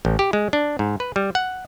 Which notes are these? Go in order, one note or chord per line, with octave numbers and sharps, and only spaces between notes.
A1
G4
G#3
D4
G#2
B4
G3
F#5